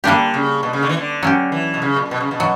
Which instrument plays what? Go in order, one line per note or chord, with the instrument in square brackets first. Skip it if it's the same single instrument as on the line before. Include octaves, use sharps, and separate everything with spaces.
[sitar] D3 [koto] G3 A#3 D4 G4
[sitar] C#3
B2
C#3
D3
E3
D3
[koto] F#3 C#4 G4
[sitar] E3
B2
C#3
A#2
B2
C#3
B2
[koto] F#3